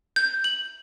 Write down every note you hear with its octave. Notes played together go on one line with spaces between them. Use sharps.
G6
F#7